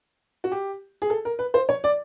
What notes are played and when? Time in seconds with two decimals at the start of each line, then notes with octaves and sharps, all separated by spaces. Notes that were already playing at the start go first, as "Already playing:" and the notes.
0.44 F#4
0.52 G4
1.02 G#4
1.10 A4
1.25 A#4
1.39 B4
1.54 C5
1.69 C#5
1.84 D5